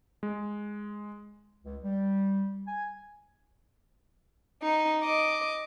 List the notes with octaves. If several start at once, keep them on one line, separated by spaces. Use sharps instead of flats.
G#3
C#2
G3
G#5
D#4
D#5 D6